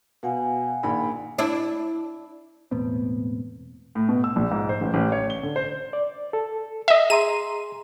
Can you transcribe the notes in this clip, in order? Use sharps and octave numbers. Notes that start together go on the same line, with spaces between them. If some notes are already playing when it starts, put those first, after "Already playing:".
B2 F5 F#5 G#5
A#1 D#3 B5
D4 E4
E1 A2 B3 C4
A2
B2
E6
A#1
G#2
C5
A1
A1
C#5
G7
D3
C5
D5
A4
D#5 E5
G#4 A#5 C6 D#7